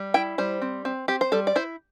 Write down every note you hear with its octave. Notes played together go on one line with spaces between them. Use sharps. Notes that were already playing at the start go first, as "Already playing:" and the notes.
Already playing: G3
E4 G5
G3 C5
C4
C4
C4 G4
C5
G3 A4
D5
E4 C5